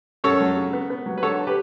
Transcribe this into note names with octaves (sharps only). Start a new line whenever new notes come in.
F#2 A4 C#5
F#3
C#3
B3
B3
F#3
B4
D3 A4 C#5
G4 B4